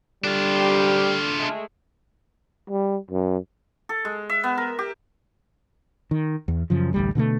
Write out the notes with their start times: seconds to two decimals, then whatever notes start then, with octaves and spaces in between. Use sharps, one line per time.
0.24 D3 G3 D4 F4
0.55 A#2 C4 G4
1.36 G#3 A3
2.70 G3
3.11 F#2
3.89 A4
4.05 G#3
4.30 E5
4.44 B3
4.58 A#4
4.79 G4
6.11 D#3
6.48 E2
6.70 F#2 C#3 F3
6.94 A1 D2 G3
7.15 B2 D3 F3 A3